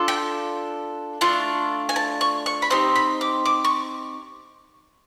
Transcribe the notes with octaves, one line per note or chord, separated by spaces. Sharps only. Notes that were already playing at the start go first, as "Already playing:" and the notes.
Already playing: D4 F4 A4
G5
A3 D4 F4
G#5
A5
C#6
C#6
B5
C4 D#4 G4 C6
B5
D6
D6
C#6